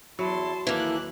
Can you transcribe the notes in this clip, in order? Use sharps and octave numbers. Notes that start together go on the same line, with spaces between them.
E2 F#3 E4 A5 C6
D#2 E3 A#3 A4 D6 F#6